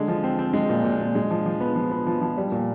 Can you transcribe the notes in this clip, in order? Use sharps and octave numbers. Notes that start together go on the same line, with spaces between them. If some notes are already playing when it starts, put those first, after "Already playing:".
Already playing: D3 G#3
F3
C4
C4
G#3
A#2
A#2
A#2
G#3
F3
F3
B3
F3
B3
F3
F3
G3
A#2